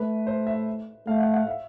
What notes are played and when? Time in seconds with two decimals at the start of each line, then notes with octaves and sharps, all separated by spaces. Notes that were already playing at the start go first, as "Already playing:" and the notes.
Already playing: A3 B4
0.27 C5
0.47 E5
1.07 A3 F5
1.20 F#5
1.34 F#5
1.47 E5